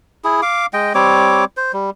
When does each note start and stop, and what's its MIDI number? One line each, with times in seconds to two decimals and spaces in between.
0.24 0.41 64
0.24 0.41 68
0.42 0.66 77
0.42 0.66 86
0.73 0.93 56
0.73 0.93 75
0.73 0.93 79
0.95 1.45 55
0.95 1.45 60
0.95 1.45 73
0.95 1.45 86
1.57 1.72 72
1.73 1.90 55